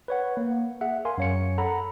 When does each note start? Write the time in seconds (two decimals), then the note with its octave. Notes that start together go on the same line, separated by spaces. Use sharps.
0.08 B4 C#5 F#5
0.37 A#3
0.81 G#4 E5 F#5
1.05 A#4 F5 G#5 C6
1.18 F#2 C#5 C#7
1.58 A4 F#5 A#5 B5